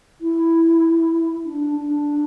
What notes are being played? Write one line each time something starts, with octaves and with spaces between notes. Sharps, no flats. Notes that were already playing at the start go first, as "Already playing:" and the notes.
E4
D4
D4